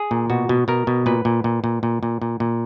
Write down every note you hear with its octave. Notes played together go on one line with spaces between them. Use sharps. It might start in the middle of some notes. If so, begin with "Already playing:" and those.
Already playing: G#4
A#2
B2 F#4
B2
B2 A#4
B2
A#2 B4
A#2
A#2
A#2
A#2
A#2
A#2
A#2